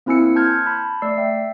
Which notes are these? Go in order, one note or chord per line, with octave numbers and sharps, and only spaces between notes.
A#3 C4 E4 G#5 E6 C#7
A5 C6 F6 G6 G#6
A5 B5
A3 D5 E6 C7
E5 G5